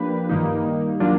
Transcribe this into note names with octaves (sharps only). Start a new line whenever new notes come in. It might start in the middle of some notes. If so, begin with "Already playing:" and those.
Already playing: F3 A#3 D4 G4 B4
G2 D#3 G3 A#3 D#4
F#3 A#3 D4 F4